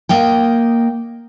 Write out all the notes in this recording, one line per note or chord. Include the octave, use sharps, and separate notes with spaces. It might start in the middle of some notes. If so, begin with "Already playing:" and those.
A#3 D#5 G5